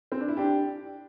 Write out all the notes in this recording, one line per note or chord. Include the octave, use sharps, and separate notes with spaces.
C4
D4
E4
D4 G4